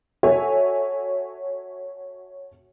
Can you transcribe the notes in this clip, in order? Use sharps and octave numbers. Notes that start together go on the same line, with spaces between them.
F#4 A4 C#5 E5 G#5